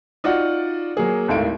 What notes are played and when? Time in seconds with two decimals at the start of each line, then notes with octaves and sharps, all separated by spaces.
0.24 D#4 F4 F#4 D5 F#5
0.97 F#3 A#3 G#4
1.28 G#1 D#2 A2 A3 D7